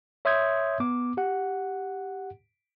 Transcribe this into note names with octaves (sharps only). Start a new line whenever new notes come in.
C#5 E5 C6 D#6 G6 G#6
B3 D6
G4 F#5